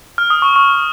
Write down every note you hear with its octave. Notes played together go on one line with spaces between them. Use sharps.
F6
D#6
C#6
C#6